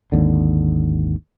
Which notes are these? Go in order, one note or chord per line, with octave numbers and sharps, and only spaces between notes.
G#1 D#2 D3